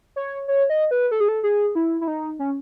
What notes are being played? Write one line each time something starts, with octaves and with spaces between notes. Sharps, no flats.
C#5
C#5
D#5
B4
A4
G#4
A4
G#4
E4
E4
D#4
C#4